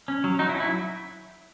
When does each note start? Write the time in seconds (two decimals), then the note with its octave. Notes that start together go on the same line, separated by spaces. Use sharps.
0.08 C#4
0.24 F#3
0.39 F#3 D#4
0.49 E4
0.55 C#4
0.60 E4